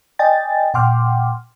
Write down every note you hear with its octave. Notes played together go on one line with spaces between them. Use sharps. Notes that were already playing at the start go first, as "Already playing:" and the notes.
D5 D#5 G5 G#5 A6
A#2 F#5 G5 C6 D6 F6